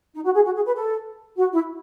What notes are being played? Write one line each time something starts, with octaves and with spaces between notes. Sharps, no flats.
D#4
F#4
G#4
F#4
G#4
B4
A4
F#4
E4